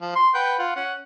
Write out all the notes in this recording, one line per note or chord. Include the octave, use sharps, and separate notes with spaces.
F3
C6
B4 F#5 G5
F4 F#5
C#4 F#5